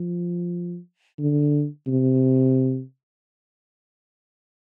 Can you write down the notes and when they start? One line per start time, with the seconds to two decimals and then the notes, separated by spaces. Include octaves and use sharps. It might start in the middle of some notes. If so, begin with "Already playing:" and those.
Already playing: F3
1.19 D3
1.87 C3